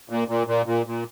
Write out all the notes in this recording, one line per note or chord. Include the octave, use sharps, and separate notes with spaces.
A#2
A#2
A#2
A#2
A#2